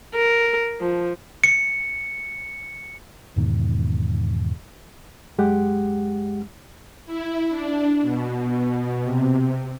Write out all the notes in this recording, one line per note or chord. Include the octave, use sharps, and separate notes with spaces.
A#4
F3
C#7
E2 G#2 B2 D#3
F#2 G#3 G4 F#5
E4
D4
B2
C3